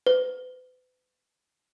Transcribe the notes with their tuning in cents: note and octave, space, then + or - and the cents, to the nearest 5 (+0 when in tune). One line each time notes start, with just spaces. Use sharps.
B4 +40